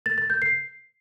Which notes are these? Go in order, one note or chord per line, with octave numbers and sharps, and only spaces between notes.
A6
A6
G6
C7